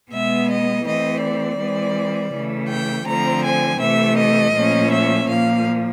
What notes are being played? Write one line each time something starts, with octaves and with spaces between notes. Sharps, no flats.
B2 G#3 B3 E5
D#5
E3 A3 C4 D#5
D5
E3 G#3 C4
C#3 E3 A3
G5
D3 F3 A3 C4 A#5
G#5
C3 E3 A3 E5
D#5
A#2 F3 A3 C#4
E5
A#2 F3 A#3 F5